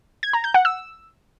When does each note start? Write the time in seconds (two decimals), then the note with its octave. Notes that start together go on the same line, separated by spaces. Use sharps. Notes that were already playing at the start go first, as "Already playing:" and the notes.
0.23 G#6
0.33 A#5
0.44 G6
0.54 F#5
0.65 E6